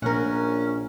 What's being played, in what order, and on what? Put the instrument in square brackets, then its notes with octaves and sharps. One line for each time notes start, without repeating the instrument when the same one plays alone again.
[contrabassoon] A#1 [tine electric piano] A#2 [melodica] C#4 [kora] A#4 F#5